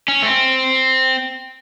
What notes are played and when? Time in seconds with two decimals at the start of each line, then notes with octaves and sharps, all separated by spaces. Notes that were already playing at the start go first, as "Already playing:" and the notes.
0.08 C#4
0.22 A3
0.26 C4